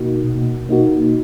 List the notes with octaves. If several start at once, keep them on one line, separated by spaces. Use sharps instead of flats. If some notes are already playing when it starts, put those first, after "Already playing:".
Already playing: B2 A#3 D#4 F#4
B2
A#3 D#4 F#4